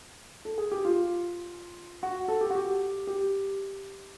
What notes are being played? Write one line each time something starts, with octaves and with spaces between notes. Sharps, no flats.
A4
G#4
G4
F4
F#4
A4
G4
F#4
G4
G4